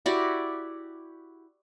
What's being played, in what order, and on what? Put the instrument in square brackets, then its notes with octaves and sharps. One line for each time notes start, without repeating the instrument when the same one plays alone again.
[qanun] E4 F#4 G4 D5